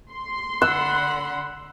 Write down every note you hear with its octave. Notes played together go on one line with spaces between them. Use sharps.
C6
D3 F#5 B5 E6 F#6